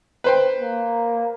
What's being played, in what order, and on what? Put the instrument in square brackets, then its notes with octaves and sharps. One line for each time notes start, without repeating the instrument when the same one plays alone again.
[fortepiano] B4 C5 G5
[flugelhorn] A#3